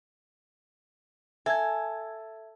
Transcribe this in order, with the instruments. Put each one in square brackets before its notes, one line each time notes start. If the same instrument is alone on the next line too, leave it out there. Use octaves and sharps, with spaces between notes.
[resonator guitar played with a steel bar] A4 [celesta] E5 G#6 [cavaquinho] G#5